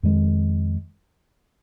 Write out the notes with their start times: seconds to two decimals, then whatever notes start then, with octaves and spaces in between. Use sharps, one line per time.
0.03 F2 D#3 G#3